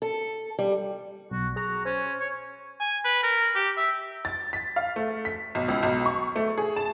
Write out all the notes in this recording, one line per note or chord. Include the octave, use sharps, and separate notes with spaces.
A4
G3
B1 F#4
F#4 G#4 A#5
C#4 C5
C#5
G#5
B4
A#4
G4
E5
A6
B6
F5
A3
B6
B1
C#2
B1
C#6
A3
G#4
A5